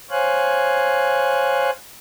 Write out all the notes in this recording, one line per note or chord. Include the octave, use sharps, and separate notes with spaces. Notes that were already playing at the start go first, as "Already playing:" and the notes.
C5 C#5 F5 G#5 F#6